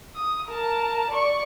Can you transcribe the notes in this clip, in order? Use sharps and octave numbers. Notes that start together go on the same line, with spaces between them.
D#6
A#4 A5
D5 C#6